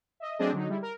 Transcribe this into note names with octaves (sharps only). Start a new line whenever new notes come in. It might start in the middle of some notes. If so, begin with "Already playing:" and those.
D#5 E5
F#3 A3 C4 D4 G#4 D#5
D3 F#3 D#4
G3 G#3 E4
A#4